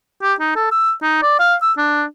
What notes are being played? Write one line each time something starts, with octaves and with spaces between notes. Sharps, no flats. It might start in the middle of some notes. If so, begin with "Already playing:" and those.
G4
D#4
A4
E6
D#4
D5
F5
E6
D4